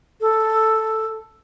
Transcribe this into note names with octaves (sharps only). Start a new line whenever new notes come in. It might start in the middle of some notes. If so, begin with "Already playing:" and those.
A4